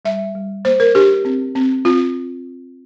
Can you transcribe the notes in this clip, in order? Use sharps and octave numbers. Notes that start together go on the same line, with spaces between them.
G3 E5
G3
A#3 C5
A#4
D4 G4
C4
C4
C4 F4